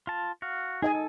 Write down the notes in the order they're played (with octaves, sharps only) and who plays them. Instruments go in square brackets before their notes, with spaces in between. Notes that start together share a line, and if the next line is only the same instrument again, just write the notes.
[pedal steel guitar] F4 A5
F#4 F5
[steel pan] D#4 D#5 G#5 [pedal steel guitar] G#4
[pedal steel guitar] A4